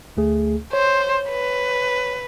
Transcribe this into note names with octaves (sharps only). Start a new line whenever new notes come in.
D2 A3 G#4
C5 C#5
B4